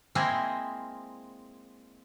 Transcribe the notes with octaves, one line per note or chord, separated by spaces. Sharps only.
G#3 A#3 C4 E4 G#4